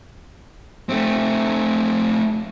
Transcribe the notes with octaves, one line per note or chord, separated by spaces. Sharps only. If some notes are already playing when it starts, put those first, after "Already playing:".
A3 C4